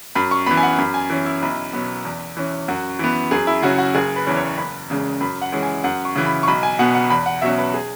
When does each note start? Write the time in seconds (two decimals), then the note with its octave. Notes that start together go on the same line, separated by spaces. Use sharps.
0.15 F#2 B5
0.31 C#6
0.46 E3 B3 B5
0.57 G#5
0.63 F#5
0.78 F#2 B5
0.94 G#5
1.10 E3 C#4
1.26 E4
1.42 B1 E4
1.73 B2 F#3 B3
2.05 E2
2.37 E3 C#4
2.68 F#2 F#4
2.99 E3 B3
3.31 F#2 G#4
3.47 E4
3.62 C#3 F#3 C#4 F#4
3.78 F#4
3.95 F#1 G#4
4.16 B4
4.26 E2 E3 C#4
4.36 C#5
4.57 F#1 B5
4.90 E2 C#3 G#3
5.21 F#2 B5
5.42 F#5
5.52 E3 G#3 C#4
5.63 G#5
5.84 F#2 F#5
6.05 C#6
6.16 C#3 E3
6.26 B5
6.43 C#6
6.48 B1 B5
6.63 G#5
6.79 B2 B3 F#5
6.95 F#5
7.10 E2 B5
7.26 F#5
7.42 B2 F#3 C#4 E5
7.58 B4
7.74 G#4